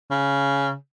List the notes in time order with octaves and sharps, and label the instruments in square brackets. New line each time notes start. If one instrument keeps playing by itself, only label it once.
[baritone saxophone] C#3